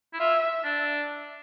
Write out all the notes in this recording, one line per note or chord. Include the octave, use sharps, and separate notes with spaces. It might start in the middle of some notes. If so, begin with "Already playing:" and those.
E4
F4 E5
D4